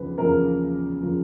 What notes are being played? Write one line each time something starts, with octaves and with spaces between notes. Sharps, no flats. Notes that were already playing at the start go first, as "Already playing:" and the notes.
Already playing: E2 C#3 F3 B4
E2 C#3 F3 A#3 A#4
C#3 F3 A#3